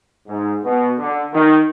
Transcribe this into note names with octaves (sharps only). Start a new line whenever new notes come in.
G#2
B2
D3
D#3